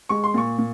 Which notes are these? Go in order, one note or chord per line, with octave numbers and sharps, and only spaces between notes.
G#3 C#6
C6
A#2 C#6
A#2